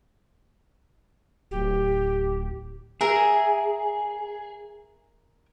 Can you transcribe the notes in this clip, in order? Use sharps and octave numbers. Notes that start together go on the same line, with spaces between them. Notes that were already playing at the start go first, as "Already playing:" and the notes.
D1 G4
G#4 A#4 E5